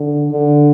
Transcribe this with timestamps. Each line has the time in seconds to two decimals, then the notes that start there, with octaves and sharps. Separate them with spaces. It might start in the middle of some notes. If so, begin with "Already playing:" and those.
Already playing: D3
0.31 D3